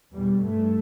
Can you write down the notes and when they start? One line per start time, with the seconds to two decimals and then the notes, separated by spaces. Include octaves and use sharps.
0.14 E2 B2 G3
0.42 G2 A3